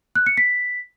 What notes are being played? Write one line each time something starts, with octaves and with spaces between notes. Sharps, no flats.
F#6
C#7
B6